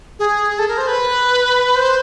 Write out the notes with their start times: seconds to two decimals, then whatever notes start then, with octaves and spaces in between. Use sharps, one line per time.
0.19 G#4
0.59 A4
0.68 A#4
0.78 C5
0.88 B4
1.75 C5